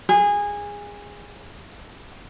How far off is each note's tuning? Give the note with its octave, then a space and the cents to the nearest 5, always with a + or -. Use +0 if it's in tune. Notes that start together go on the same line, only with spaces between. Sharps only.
G#4 -20